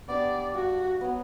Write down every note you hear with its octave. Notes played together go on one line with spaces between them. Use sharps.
B3 D4 G4 D5
G2 F#4
F#3 B3